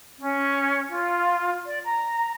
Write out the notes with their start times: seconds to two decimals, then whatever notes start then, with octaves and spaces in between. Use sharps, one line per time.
0.18 C#4
0.89 F4
1.65 D5
1.84 A#5